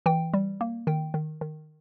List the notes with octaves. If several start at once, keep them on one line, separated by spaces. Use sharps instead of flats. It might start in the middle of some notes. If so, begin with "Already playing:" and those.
E3 G5
G3
A#3
D#3 G5
D#3
D#3